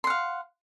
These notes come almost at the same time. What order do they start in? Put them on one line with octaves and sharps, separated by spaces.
C6 F#5 F5